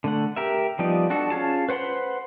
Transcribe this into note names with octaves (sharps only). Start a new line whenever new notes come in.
D3 A3 F#5
G4 A#4 E5
F3 G3 B3 D#4 D5
D4 F#4 A4
C#4 F4 G#4 A5
B4 C5 F#5 B5 C6